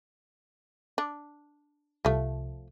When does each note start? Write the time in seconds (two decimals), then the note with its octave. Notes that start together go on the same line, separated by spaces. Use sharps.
0.98 D4
2.05 C2 C3 F3 A3